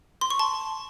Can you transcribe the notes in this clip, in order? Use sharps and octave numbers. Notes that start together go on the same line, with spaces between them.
C6
C#6
A5